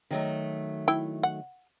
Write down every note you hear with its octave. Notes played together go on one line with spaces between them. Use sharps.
D#3 F#3 A3
E4 G5
F#5